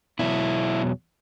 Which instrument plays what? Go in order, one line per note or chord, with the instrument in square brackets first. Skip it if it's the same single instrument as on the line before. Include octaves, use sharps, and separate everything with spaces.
[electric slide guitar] E2 B2 F#3 E4